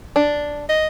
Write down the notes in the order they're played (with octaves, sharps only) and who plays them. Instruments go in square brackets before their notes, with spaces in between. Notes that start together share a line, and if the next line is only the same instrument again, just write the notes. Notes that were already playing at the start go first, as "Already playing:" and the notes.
[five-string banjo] D4
[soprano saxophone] D#5